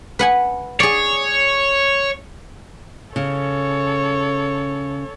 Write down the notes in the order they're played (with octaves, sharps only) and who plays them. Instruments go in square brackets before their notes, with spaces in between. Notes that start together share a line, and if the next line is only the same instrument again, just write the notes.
[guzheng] B4 F#5 G#5
[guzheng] G#4 D5 [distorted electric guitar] C#5
[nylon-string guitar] C#3 [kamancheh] A4 C#5